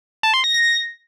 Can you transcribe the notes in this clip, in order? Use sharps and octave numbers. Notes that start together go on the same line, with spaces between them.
A5
C6
A#6
A#6